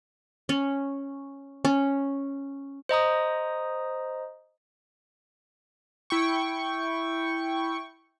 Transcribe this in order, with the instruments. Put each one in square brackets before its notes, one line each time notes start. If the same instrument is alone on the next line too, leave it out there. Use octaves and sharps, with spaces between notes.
[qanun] C#4
C#4
[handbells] C5 D#5 A#5 D#6
[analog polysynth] E4 G5 C#6